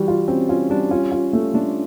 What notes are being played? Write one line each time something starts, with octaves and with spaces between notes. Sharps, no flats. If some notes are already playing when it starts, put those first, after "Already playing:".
Already playing: E3 G3 F#4
F4
C4 C#4
C#4 F4
G3 D4
C#4 F4
F4
A3
A3 D4